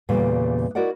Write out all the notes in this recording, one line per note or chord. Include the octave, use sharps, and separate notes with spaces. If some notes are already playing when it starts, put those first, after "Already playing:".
E2 A#2 C#3 G3 A3
E4 F#4 A#4 D5 D#5 F#5